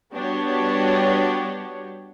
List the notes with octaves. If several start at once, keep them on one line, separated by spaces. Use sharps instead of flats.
G3 B3 D4 F#4 G4 C#5